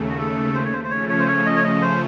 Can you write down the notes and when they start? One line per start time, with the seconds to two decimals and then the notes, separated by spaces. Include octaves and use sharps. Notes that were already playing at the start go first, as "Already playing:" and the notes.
Already playing: D#2 C#3 A3
0.09 F#4
0.18 A4
0.54 C5
0.65 C#5
0.73 C5
0.84 C5
0.91 C#3 F3 A3 C#4 C#5
1.09 C#5
1.19 C5
1.28 C#5
1.46 D#5
1.56 C#5
1.64 D#5
1.82 C5